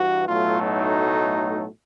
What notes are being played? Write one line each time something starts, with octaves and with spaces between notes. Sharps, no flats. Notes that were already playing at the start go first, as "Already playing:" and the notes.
Already playing: G2 E3 F#4
B1 A2 F#3 A3 F4
D#4